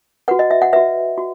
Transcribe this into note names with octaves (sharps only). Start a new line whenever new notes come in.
F#4 B4 F#5
D#5
E5
F#5
F#4 B4 E5
F#4